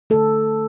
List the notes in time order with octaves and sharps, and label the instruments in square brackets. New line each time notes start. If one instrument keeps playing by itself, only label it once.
[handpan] D3 A3 A4